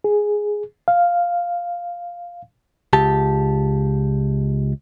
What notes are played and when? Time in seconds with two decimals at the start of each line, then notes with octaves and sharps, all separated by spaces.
0.04 G#4
0.88 F5
2.93 C#2 G4 A5